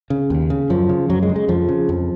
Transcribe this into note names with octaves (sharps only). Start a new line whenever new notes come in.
C#3
D#2
C#3
F#2 F3
C#3
F#2 F#3
G#3
C#3
G#3
F2 F3
C#3
F2